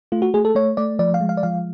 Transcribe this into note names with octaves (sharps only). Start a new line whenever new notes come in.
A3 F4
F#4
A3 G#4
A4
A3 C#5
A3 D5
F3 D5
F5
G#3
F5
D5
F3 F5